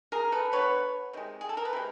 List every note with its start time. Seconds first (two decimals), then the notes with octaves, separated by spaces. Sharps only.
0.12 G#4 A#4
0.32 A4 B4
0.52 D3 F#3 B3 B4 C#5
1.13 C3 D#3 G#3
1.41 G#4
1.49 A4
1.57 A#4
1.65 B4
1.73 C3 D#3 G#3